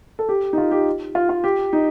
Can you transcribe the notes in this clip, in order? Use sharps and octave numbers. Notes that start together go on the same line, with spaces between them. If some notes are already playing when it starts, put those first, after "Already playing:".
A4
G4
D#4
F4
G4
F4
F4
G4
D#4